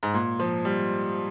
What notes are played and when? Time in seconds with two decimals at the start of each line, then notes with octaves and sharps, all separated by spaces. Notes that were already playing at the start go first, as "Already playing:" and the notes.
0.03 G#2
0.14 A#2
0.39 F3
0.65 G3